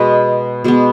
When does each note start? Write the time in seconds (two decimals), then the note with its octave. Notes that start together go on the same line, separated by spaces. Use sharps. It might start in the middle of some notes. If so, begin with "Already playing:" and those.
Already playing: B2 G#3 B3 B4 D#5
0.64 B2 G#3 B3